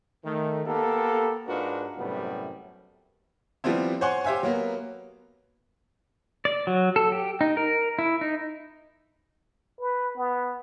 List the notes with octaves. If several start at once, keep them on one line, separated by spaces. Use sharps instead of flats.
D#3 A3
A#3 B3 G4 A4
G#2 D4 F4 F#4 A#4 B4
F#2 A2 C3 F#3 G3 B3
F3 G3 B3 C4 E4
C5 C#5 F#5 G#5 C6 C#6
G4 C5 E5 F5 G#5
F#3 A#3 B3
D5
F#3
A4
G4
D#4
A#4
E4
D#4
B4
B3